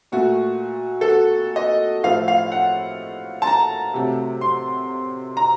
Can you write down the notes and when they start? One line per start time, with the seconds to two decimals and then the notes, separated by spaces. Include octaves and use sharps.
0.12 A#2 A3 F#4
1.01 A4
1.09 F#4
1.56 D#5
2.03 A2 F3 A3 F5
2.28 F5
2.52 F#5
3.42 A5
3.47 A#5
3.94 C3 F#3 A3
4.41 C6
5.37 A#5